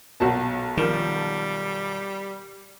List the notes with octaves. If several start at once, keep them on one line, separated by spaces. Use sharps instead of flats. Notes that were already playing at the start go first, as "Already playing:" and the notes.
B1 A#2 F#4 A5
D#3 F3 G3 A#3 A#4